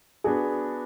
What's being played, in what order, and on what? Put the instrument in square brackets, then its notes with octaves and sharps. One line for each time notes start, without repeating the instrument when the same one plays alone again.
[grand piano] B3 D4 F#4 [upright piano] G#4